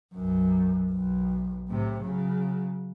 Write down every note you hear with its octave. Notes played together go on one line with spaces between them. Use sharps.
B1 F#2
B1
A2 C3
C#3 F#3